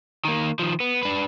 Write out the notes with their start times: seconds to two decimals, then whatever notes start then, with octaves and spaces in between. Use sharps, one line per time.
0.25 D#3 A#3
0.59 D#3 F3
0.80 B3
1.03 D4 B4